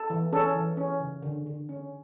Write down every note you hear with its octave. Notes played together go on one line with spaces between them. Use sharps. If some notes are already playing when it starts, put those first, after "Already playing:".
Already playing: A4
E3
C#4 A4
E3
C#4
C#3
D3
D3
C#4